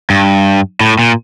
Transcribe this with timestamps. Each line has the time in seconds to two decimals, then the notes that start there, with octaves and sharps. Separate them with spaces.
0.10 G2
0.81 A2
0.99 A#2